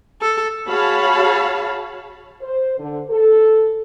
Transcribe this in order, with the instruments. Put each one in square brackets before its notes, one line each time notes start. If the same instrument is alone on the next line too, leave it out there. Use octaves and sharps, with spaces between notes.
[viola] A4
[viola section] F#4 G#4 C#5 F5 A5 B5
[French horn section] C5
D3
A4